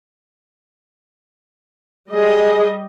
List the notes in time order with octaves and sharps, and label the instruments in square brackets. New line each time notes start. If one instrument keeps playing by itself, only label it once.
[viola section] G3 D#5 [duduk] G#4